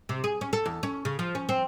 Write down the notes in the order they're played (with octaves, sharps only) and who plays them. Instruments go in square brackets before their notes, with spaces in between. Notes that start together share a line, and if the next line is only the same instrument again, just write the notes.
[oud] C3
G#4
C#4
A4
E2
C#4
C#3
F3
C#4
C4